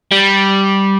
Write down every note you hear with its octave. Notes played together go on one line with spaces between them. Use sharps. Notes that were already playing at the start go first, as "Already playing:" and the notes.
G3